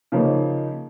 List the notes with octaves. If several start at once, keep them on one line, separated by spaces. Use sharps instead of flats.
C#3 F3 A#3 D#4